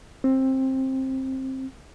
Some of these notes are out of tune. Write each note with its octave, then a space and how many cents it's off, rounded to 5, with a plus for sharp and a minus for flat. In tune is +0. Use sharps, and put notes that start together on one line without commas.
C4 +15